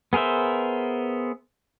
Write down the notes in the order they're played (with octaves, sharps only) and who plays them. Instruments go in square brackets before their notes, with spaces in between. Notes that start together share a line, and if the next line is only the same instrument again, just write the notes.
[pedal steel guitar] B3 G#4 A#4 C5 E5